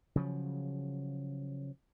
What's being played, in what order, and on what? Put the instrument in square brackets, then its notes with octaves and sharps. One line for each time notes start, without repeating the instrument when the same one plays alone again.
[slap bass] C#3 F3 F#3